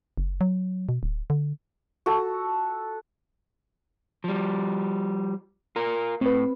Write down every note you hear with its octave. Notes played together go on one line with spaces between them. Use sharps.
F#1
F#3
B2
D1
D3
F#4 A4
F3 G3
F4 A#4
A2 C4 B4